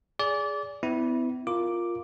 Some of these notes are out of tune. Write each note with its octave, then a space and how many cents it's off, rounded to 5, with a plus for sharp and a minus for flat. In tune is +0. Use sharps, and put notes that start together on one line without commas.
G#4 +0 D5 -25
B3 +40 E4 -15
F4 +0 A#4 +0 D6 +0